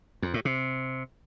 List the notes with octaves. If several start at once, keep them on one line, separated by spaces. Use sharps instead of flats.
F2
A2
C3